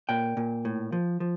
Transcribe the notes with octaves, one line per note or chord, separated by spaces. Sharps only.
A#2 G5
A#2
A2
F3
F3